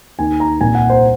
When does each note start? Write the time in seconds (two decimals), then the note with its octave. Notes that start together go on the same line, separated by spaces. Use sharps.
0.18 D#2 D#3 G#5
0.40 A#5
0.61 C2 A#2 G#5
0.75 F#5
0.90 C5